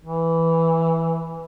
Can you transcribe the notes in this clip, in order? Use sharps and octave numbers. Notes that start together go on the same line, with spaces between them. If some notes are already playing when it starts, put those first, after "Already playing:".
E3